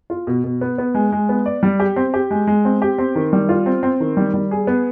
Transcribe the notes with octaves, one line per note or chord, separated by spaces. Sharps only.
F4
B2
B2
B3
B3
G#3
G#3
B3
D5
G3
G4
C4
G4
G#3
G#3
C4
G4
C4
D#3
G3
F4
C4
C4
D#3
G3
G3
G#4
B3